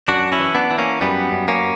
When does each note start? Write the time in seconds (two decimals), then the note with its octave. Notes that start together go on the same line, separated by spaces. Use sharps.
0.08 F#2 D4 F#4
0.32 C#4 E4
0.39 E3
0.55 B3 D4
0.71 E3
0.78 A#3 C#4
1.01 F#2 G3 B3
1.32 F#2
1.48 A#3 C#4